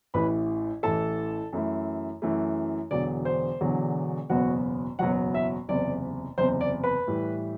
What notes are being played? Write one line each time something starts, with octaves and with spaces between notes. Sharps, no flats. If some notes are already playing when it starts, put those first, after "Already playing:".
A1 A2 E3 B4 B5
A1 A2 E3 A4 A5
F#2 E3 A3 E4
F#2 E3 A3 E4
E1 E2 D3 F#3 D5
C5
E1 E2 D3 F#3
F#1 E2 B2 F#3 B3 F#4 F#5
F#1 E2 B2 F#3 B3 F#4 F#5
E4 E5
F#1 E2 C3 D5
F#1 E2 C3 C5
D5
B4 B5
A2 E3 G3